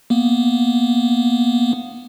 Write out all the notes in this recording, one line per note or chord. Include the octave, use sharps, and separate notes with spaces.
A#3 B3